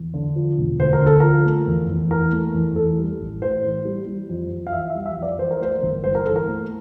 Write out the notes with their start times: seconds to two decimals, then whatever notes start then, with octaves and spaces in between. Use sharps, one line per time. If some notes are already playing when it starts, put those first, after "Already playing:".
Already playing: E2
0.14 D3
0.36 F3
0.58 E1
0.80 D2 C5
0.93 A#4
1.01 D3
1.06 A4
1.20 F3 A#4
1.46 A3
1.67 E2
1.89 E2
2.11 E3 A#4
2.32 A3
2.54 E2
2.76 E3 A4
2.98 G3
3.20 A1
3.42 A2 C5
3.64 E3
3.85 G3
4.07 G3
4.29 F2
4.52 F2
4.67 F5
4.72 E3 E5
4.90 E5
4.95 G3
5.06 E5
5.17 F2
5.22 D5
5.38 E3 C5
5.51 A#4
5.61 A3 C5
5.83 G1
6.04 G2 C5
6.15 A#4
6.26 E3 A4
6.36 A#4
6.48 A3